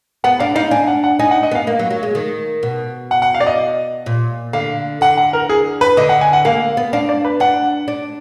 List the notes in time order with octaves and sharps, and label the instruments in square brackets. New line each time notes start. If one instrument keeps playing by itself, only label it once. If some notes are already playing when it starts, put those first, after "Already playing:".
[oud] B3 [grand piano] F#5
[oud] D4 [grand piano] F5
[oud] D#4 [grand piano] F5
[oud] D4 [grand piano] G#5
[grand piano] F#5
F#5
[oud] D#4 [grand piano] G#5
[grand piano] F#5
D#5
[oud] B3 [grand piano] F5
[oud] A#3
F#3
F#3
G#3
D#3
B2
[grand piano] F#5
F#5
F5
D5
D#5
[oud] A#2
[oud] D3 [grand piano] F5
[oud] D3 [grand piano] F#5
[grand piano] F#5
A#4
G#4
B4
[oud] D3 [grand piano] D#5
[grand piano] F#5
G#5
F#5
[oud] A#3 [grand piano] F5
[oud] B3
[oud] D4 [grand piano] F5
[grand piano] D5
B4
[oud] D4 [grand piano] F#5
[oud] D4